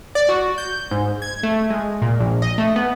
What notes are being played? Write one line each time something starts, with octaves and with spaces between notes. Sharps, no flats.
D5
F#4
G6
G#2
G#6
A3
G#3
A#2
A#1
D#5
A3
B3